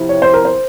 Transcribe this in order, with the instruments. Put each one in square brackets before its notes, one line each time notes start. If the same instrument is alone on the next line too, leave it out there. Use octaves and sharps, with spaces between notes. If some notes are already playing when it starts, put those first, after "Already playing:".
Already playing: [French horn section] C3 F3 C4 E4
[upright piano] C#5
C5
A#4
C5